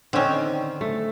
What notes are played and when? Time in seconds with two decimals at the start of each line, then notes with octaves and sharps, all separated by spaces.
0.13 D3 D#3 C4 C#4
0.81 A3